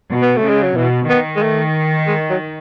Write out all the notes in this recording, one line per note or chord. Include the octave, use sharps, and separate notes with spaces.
B2
B3
A3
C#3 G#3
F#3
B2 E3
D#3 B3
G#3
A3
G#3
F#3